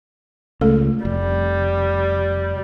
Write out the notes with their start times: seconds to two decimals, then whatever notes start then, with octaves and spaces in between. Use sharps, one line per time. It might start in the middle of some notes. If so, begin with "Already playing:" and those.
0.61 C#2 A3 A4
1.05 F1 G3